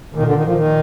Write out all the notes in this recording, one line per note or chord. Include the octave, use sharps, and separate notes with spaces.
A#2 D#3
D3
D#3
F3
D#3